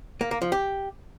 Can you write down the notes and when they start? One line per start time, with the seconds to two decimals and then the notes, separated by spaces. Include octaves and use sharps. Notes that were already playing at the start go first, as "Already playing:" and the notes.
0.21 A#3
0.31 A#3
0.42 F3
0.52 G4